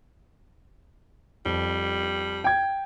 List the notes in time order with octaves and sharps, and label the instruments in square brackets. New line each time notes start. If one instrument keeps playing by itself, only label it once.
[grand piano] F2 [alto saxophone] G3
[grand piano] G5 G#6